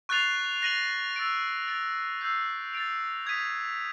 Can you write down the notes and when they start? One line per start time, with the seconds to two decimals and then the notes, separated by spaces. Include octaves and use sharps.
0.09 C#6 F#6 A6 C7 F7
0.62 F#6 A#6 D#7 F#7
1.14 E6 A6 D7 F7
1.68 A6 D7 F7
2.21 E6 G6 C7
2.73 A6 D7 F7
3.26 D#6 G#6 B6 D#7